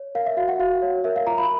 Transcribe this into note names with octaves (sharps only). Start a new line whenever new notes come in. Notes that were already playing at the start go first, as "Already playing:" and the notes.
Already playing: C#5
A#4 F5
E5
F#4 F5
F#5
F#4 F5
C#5
A#4 E5
F5
F4 A#5
B5